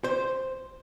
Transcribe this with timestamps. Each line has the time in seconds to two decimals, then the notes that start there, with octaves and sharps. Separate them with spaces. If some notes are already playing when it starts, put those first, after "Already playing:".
0.04 C5